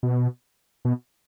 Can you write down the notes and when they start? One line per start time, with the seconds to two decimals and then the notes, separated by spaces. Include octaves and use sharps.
0.03 B2
0.85 B2